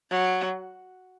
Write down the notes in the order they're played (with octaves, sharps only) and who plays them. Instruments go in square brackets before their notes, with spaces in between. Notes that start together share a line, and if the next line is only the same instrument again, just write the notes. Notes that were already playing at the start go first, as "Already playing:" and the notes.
[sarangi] F#3